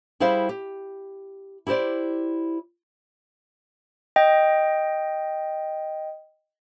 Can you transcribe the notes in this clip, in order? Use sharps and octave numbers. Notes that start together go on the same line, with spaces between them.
G3 E4 G#4 C5 F5
G4
E4 G4 A4 C5 D5
D#5 G5